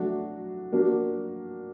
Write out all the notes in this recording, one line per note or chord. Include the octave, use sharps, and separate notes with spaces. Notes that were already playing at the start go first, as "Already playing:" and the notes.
Already playing: F#3 A3 D4 F#4
F#3 A#3 D4 F#4